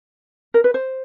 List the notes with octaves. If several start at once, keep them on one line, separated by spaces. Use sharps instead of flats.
A#4
B4
C5